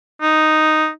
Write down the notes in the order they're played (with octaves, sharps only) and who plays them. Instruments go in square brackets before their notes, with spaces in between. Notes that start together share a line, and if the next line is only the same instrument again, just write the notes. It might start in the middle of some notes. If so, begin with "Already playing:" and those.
[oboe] D#4